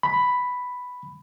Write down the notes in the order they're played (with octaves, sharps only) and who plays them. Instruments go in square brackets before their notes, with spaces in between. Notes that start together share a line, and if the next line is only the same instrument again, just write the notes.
[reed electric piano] B5